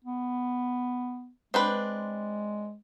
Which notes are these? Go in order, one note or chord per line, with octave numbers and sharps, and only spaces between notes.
B3
G#3 C4 D4 B4